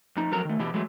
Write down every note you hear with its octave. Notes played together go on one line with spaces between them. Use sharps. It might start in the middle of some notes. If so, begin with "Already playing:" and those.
F2 D#4
F2 F#3 A4 A#4 A#5
D#3 A3
B2 E3 E4 G4
E3 F#3 G#3 A3